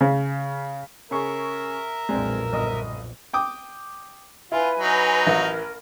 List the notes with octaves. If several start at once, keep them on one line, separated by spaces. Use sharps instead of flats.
C#3
C#3 G#4 A#4 E5 C#6
B1 F2 A#2 G#3 C4 D4
G1 D#5 D#6
G5 D6 D#6
E4 F4 B4 G#5
F#3 D#4
A1 E3 E4 A#4